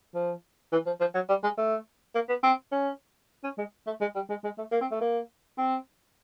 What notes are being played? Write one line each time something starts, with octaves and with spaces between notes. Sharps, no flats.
F3
E3
F3
F3
F#3
G3
G#3
A3
A#3
B3
C4
C#4
C#4
G#3
A3
G#3
G3
G#3
G#3
A3
A#3
C4
A3
A#3
C4